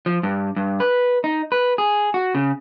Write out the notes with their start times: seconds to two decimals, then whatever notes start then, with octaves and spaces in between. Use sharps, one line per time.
0.06 F3
0.23 G2
0.56 G2
0.80 B4
1.24 D#4
1.52 B4
1.78 G#4
2.14 F#4
2.35 C#3